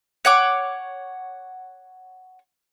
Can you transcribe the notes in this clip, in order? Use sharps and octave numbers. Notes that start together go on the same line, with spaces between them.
C#5 F#5 D6